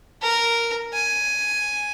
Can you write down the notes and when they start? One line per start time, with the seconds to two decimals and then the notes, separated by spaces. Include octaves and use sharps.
0.22 A#4
0.94 G#5